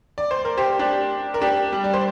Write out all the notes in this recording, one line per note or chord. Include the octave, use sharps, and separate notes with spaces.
D5
C5
A#4
G4 C5
D4 G4
A#4
D4 G4
G3
D5
C5